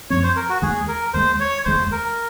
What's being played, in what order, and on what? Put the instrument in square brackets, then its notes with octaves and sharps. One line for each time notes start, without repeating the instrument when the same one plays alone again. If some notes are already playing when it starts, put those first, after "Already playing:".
[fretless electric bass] F#2 F3 C4 [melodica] C#5
[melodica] C5
A#4
F#4
[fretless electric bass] D#2 D#3 G#3 [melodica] G#4
[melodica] A#4
[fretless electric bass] D#2 D#3 G#3 [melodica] C5
[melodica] C#5
[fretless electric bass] F1 D#2 D#3 G#3 [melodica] C5
[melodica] A#4